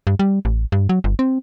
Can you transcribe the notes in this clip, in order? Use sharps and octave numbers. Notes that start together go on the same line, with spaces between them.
G2
G3
A1
G2
F#3
G1
C4